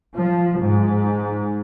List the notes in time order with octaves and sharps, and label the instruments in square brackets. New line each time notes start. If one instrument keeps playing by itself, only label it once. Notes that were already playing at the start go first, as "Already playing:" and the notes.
[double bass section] F3
G#2